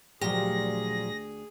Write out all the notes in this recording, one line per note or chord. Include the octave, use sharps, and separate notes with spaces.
D2 A#2 F3 F#3 G4 G#4 A#6